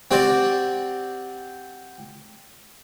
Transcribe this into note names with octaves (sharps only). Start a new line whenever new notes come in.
C4 F#4 G4 C5 D5